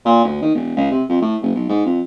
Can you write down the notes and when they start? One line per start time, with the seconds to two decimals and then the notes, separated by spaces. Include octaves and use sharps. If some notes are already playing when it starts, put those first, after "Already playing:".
0.05 A#2
0.25 D2
0.42 D#3
0.55 E1
0.77 C#2
0.91 C3
1.09 F2
1.21 A2
1.41 F#1
1.55 B1
1.69 G#2
1.86 F2